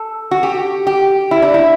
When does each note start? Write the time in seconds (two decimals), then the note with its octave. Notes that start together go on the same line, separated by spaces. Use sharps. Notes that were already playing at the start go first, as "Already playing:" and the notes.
Already playing: A4
0.31 F#4
0.43 G4
0.87 G4
1.31 E4
1.42 D4
1.54 E4